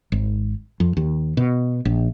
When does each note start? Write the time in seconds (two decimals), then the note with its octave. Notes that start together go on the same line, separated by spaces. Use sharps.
0.12 G#1
0.80 F2
0.97 D#2
1.37 B2
1.85 A#1